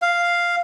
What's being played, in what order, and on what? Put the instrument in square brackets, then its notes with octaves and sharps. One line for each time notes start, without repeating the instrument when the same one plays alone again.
[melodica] F5